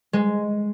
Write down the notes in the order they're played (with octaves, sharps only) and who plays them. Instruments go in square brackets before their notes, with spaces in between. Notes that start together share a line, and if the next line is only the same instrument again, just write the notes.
[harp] G#3